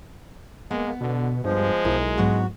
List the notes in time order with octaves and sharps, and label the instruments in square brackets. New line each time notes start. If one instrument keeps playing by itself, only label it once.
[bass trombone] G#3 [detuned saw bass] A#3 [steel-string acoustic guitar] B3
[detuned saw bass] B2 [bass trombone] D3
[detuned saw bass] G2 [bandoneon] F3 [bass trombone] G#3
[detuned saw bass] B1 [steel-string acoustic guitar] E4 A#4
[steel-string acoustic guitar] G#2 F#3 B3 [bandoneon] F#4